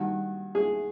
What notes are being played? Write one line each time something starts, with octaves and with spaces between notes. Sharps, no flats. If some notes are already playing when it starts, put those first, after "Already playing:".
Already playing: G2 D#3 F#4
G#4